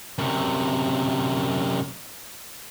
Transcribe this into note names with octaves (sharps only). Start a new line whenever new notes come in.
F#2 C3